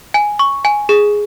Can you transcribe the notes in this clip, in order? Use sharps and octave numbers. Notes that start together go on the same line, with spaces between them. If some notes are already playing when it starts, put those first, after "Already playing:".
G#5
C#6
G#5
G#4